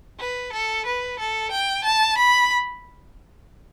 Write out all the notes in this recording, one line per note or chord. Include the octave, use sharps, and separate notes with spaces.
B4
A4
B4
A4
G5
A5
B5